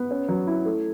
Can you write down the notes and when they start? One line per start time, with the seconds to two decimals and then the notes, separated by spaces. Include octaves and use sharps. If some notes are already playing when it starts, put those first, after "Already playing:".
Already playing: B3
0.11 C#4
0.29 F#3
0.47 E4
0.66 A3